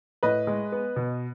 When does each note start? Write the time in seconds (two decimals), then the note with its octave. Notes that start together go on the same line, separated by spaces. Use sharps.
0.23 A2 B4 D#5
0.47 G#3
0.72 B3
0.96 B2